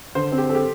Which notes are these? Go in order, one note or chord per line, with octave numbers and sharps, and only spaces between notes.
D3 C5
C4
G4
G4 A4